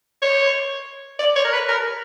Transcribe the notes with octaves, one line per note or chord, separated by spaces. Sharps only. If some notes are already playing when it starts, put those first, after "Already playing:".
C#5
D5
C#5
A#4
B4
A#4